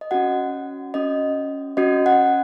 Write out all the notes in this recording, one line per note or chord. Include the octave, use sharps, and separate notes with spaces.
D#5
C#4 F#4 F#5
C#4 F#4 D#5
C#4 F#4 D#5
F#5